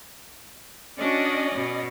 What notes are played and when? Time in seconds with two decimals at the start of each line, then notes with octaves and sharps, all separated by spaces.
0.98 C#4 D4 F#4 D5 D#5
1.54 B2